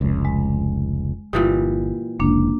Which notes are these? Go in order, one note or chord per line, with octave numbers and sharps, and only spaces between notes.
F1 C#2
G#3
G1 A#2 E3 G3 D#6
F1 C#2 A#3 D4